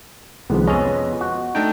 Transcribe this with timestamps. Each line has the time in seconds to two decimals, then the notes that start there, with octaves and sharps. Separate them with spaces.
0.50 C2 C3 D#3 F3 G#3 B3
0.67 F2 C#4 D#5
1.21 F#4
1.55 A3 D4 D#4 G5